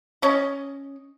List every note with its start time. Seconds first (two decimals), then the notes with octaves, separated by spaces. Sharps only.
0.22 C#4 D#5